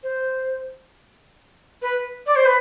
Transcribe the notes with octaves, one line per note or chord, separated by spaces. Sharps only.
C5
B4
D5
C5
B4